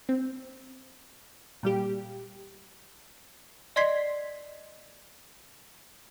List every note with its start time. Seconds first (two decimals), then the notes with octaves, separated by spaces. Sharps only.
0.09 C4
1.63 A#2 G3 G4
3.76 D5 D#5 C6 G#6 B6 C7